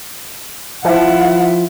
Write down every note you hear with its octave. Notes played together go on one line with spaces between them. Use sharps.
F3 E4 F#5